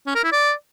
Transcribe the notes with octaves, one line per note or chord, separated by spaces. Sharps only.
C#4
A#4
E4
D5